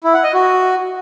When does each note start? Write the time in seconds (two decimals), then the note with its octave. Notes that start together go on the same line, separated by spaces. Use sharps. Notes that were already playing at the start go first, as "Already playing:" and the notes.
0.04 E4
0.14 F#5
0.24 D#5
0.34 F#4